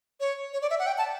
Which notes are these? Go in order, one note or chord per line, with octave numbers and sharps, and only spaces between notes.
C#5
C#5
D5
E5
F#5
G5
A5